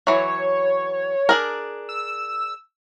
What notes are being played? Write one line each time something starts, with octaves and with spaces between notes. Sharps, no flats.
E3 F#3 C#5
D4 G#4 A#4
E6